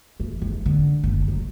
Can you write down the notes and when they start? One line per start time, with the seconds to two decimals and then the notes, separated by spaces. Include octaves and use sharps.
0.20 E3
0.42 G#1
0.66 D3
1.03 F#1
1.28 F#3